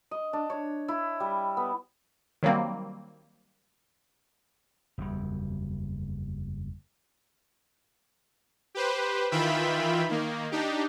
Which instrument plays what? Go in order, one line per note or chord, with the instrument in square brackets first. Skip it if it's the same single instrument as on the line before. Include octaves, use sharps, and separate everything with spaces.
[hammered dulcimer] D#5
D4
C#5
E4
G3
B3
[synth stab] D#3 F#3 G3 A#3 C4
[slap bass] F#1 E2 G3
[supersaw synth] G4 B4 C5
D#3 E3 F4 E5 G5 B5
D#3 A#3
D4 D#4 G4